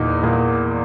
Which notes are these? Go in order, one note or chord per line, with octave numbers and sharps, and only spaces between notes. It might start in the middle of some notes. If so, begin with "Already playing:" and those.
Already playing: E2 A#2 D#4
A#2